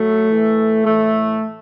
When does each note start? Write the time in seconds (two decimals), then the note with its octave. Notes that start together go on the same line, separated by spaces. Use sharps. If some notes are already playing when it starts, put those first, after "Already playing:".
Already playing: A2 F#3 A3
0.30 A2 E3
0.85 A2 E3 A3